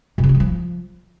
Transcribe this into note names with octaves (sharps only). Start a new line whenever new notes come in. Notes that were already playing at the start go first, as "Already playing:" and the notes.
A#2
C#3
E4
F#3
F3